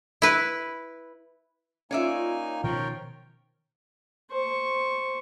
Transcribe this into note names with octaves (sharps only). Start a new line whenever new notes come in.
E4 B4
A#3 C#4 D#4 F4 C#5 D5 E5 G#5
B2 D#3 F3 A#4 C#5 G5
C5 C#6